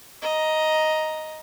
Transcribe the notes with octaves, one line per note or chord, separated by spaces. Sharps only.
D#5 A#5